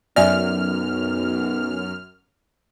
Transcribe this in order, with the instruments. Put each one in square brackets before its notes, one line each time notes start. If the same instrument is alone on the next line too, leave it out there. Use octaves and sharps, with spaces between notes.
[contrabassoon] B1 [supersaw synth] F#2 F6 [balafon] D5 E5 G#5